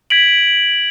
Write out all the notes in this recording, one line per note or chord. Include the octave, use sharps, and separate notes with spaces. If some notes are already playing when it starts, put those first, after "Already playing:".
G#6 B6 D7 F#7